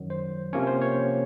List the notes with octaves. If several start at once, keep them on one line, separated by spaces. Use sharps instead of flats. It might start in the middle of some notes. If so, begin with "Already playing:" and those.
Already playing: F#2 D#3 F#3
C5
C3 F3 A#3 C#4 C#5
C5
C#5